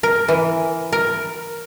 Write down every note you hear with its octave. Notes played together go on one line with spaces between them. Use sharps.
A#4
E3
A#4